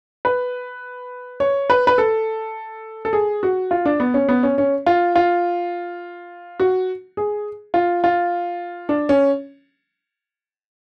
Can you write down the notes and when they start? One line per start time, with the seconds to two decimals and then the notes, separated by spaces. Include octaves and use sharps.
0.25 B4
1.40 C#5
1.70 B4
1.87 B4
1.98 A4
3.05 A4
3.13 G#4
3.43 F#4
3.71 F4
3.85 D4
4.00 B3
4.14 C#4
4.29 B3
4.43 C#4
4.58 C#4
4.86 F4
5.16 F4
6.60 F#4
7.17 G#4
7.74 F4
8.04 F4
8.89 D4
9.09 C#4